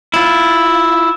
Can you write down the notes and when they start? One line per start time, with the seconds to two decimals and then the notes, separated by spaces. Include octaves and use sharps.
0.14 E4 F4